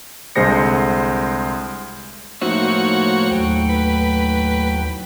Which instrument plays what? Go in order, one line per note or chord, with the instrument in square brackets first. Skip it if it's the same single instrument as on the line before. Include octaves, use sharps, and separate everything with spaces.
[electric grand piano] C2 D3 G#3 C5 A#6 C#7
[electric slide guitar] A2 D#4 E5 [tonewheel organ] F3 A#3 C5 [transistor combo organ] F#4 C#5
[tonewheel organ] D#2 F#3 G5
[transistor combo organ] B4